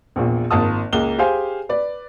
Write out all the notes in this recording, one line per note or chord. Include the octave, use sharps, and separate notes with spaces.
A#1 E2 A#2
G#1 A#3 F4 A5 D#6
C#2 A#3 G7
G4 G#4 C5 F5 G#5
B4 D5